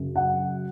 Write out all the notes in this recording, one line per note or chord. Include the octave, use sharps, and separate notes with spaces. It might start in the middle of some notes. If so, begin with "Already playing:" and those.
Already playing: F#2 C#3
F#5